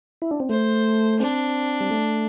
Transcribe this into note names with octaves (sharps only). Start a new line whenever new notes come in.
E4
D4
C4
A3 C5
C4 D4
G3
A3